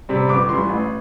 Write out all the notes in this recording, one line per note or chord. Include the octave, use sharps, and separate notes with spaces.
C3 G3 C4
G1 D6
G2 E3 C6
A1